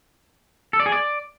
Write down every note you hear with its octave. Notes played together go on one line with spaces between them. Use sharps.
A4
D5
G#4
D5